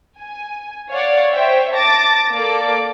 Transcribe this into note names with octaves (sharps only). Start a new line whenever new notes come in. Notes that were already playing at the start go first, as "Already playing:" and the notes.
G#5
C#5 D5 F5 F#5
C5 C#5 E5 G5
A5 D6 A6 A#6
A#3 A4 D5 D6